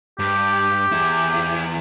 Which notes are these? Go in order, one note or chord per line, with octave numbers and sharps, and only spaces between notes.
G2 G4
E2 E4